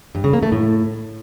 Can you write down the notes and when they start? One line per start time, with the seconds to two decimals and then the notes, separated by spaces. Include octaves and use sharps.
0.15 G2
0.24 C#3
0.33 A#3
0.43 A3
0.52 A2